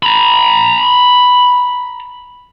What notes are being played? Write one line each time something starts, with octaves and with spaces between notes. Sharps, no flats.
A#5 B5